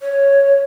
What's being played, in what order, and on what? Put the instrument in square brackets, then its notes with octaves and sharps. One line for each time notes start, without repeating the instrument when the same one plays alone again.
[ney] C#5